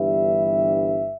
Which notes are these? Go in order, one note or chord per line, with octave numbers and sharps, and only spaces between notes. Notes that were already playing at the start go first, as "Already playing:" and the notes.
Already playing: G1 G2 E3 G3 E5